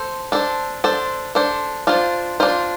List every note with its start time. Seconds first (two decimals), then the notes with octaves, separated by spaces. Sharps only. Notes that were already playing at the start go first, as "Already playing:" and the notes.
Already playing: A4 C5
0.32 D4 A4 C5
0.84 D4 A4 C5
1.35 D4 A4 C5
1.87 D4 F4 C5
2.40 D4 F4 C5